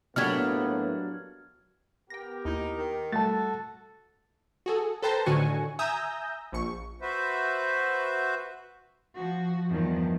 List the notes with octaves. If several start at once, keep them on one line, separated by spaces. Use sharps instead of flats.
A2 F#3 A#3 B3 D4 G4 F6 G#6
B3 G4 A#4 G5 A#6
D#2 D#4 E4
D#3
G3 A3 F#4 A4 A5 A6
F#4 G#4 A4
A4 B4 C5 G5 A5 A#5
A2 D3 D#3 F#4 G#5 C#6
E5 G#5 A#5 D#6 E6 G6
A#1 C#6
F#4 B4 C5 E5
F3 F#4
E2 G2 D#3 F3